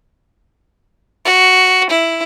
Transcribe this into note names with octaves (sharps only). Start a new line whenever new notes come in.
F#4
E4